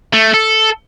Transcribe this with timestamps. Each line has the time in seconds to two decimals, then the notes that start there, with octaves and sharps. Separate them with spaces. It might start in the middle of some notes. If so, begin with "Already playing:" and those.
0.13 A3
0.34 A4